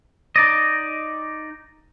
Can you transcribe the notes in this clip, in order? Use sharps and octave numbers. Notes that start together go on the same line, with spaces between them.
D#4 D5 D#5